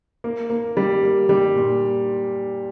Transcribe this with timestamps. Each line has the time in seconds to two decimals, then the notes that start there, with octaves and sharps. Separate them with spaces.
0.24 A#3
0.50 A#3
0.77 G3
1.03 A#3
1.29 G3
1.55 A#2